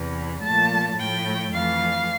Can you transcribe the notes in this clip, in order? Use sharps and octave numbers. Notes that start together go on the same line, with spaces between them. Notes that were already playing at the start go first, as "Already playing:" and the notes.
Already playing: E2 C3 E3
A#2 F3 A3 A5
A2 F3 A3 G5
F2 E3 A3 F5